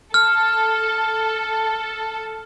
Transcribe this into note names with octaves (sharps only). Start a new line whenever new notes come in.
A4 F6